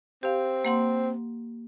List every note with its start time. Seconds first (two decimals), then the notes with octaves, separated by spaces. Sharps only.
0.23 C4 G4 F5
0.65 A#3 F#5 C6